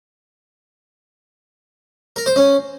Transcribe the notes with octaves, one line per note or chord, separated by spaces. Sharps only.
A#4
C5
C#4